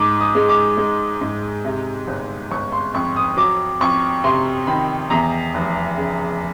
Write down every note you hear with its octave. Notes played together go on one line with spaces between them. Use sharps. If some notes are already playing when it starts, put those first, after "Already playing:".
Already playing: G#2 D6
D#6
G#3
D6
G#3
G#2
C3
G1
G1 C#6
C6
F2 C#6
D#6
F#3 D6
F2 C#6
C3 C6
D#3 B5
E2 A#5
F1
C#3